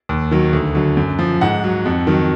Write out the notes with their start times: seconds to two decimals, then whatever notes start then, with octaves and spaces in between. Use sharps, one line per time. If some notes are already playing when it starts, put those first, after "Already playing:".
0.09 D#2
0.31 D#3 F#3
0.53 D2
0.75 D3 F#3
0.97 F#2
1.19 F3
1.41 G#2 F#5
1.64 F#3
1.85 F2
2.07 D#3 F#3